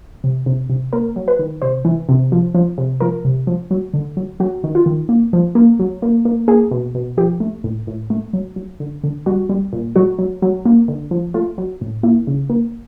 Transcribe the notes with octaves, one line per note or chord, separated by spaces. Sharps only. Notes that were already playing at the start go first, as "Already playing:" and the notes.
C3
C3
C3
A#3 A#4
F#3
B4
D#3
C3 C5
E3
C3
F3
F3
C3
F3 A#4
C3
F3
F#3
D3
F#3
F#3 F#4
D#3
F4
D#3
A#3
F3
A#3
F#3
A#3
A#3
A#3 G#4
B2
B2
F3 G4
A3
A2
A2
A3
F#3
F#3
D3
D3
G3 F#4
G3
A#2
F#3 F#4
F#3
F#3
A#3
D3
F3
A3 F4
F#3
A2
A#3 E4
C#3
A#3